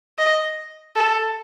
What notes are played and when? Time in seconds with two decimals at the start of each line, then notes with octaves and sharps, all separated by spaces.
0.18 D#5
0.96 A4